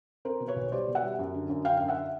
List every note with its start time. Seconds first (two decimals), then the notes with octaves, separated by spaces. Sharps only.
0.25 C4 A#4 C5
0.40 B2
0.48 B4 C#5
0.56 B1
0.72 G3 C5 D5
0.88 B2
0.95 E5 F#5
1.03 G3
1.19 F#2
1.34 D3
1.50 F#2
1.65 D3 F5 G5
1.77 F#2 F5
1.88 E5 F#5